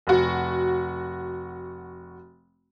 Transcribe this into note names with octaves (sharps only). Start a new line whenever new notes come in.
F1 F#4